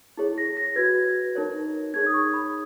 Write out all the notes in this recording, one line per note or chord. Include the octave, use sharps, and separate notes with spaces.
E4 G#4 C#5
A#6
A#6
F#4 B4 G#6
D#4 A#4 C#5
D#4 G#4 C#5 G#6
D#6
C#6
B5